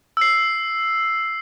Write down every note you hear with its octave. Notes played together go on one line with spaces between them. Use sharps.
E6 C7